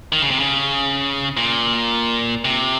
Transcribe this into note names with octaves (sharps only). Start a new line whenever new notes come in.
D#3
C#3
C3
C#3
A#2
C3